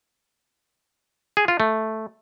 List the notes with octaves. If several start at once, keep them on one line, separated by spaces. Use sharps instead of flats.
G#4
F4
A3